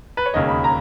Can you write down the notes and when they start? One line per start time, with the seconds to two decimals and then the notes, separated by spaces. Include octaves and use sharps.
0.17 B4
0.26 C#5
0.34 E1 D#2 C#3 D#5
0.49 B5
0.64 A#5